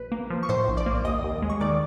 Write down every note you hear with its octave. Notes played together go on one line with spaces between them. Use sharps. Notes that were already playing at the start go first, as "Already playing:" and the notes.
Already playing: A#1 B4
A#3
F3
C#6
A2 C5 C6
A#1
D5 D6
A#3
D#2 D#5 D#6
D#2
G#3
C#6
D#3 D5 D6